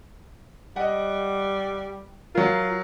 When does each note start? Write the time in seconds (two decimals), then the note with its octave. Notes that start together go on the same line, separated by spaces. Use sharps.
0.76 G3 D#5 F#5
2.35 F#3 F4 A#4